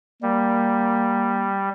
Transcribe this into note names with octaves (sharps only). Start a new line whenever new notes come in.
G3 A#3